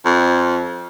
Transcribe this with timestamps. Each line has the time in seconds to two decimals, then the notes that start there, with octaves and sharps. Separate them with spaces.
0.05 F2